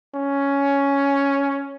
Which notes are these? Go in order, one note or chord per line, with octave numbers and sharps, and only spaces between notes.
C#4